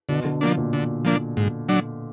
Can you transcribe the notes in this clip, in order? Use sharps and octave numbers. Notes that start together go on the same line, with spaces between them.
B2 D3
D3
F3 A#3 D4
A#2
D3
F3 A#3 D4
G#2
F#3 D4